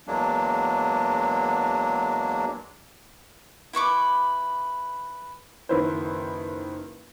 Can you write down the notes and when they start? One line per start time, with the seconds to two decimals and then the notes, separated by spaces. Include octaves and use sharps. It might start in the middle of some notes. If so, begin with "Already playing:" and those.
0.07 E2 F#3 G#3 A#3 D4
3.73 E4 B4 C#6 D6
5.69 F#1 D#3 E4 B4 C5